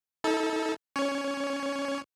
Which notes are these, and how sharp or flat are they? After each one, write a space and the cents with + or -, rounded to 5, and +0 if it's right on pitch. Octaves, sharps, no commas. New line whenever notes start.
D#4 +45 A4 +0
C#4 +0 C#5 +15